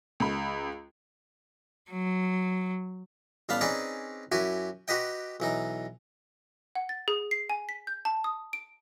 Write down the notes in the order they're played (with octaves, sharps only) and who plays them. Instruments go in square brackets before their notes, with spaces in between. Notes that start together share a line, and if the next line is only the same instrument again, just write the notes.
[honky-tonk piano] C#2 B5
[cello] F#3
[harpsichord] A1 G3 B3 F5 A5 B5
C4 C#4 D#4 G#4 B4 D5
F#2 E4 F#4 G4 G#5
F#4 G4 B4 D#5 G5
B1 E3 D#4
[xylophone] F#5
A6
G#4
C7
G#5
B6
G6
A5
D#6
D7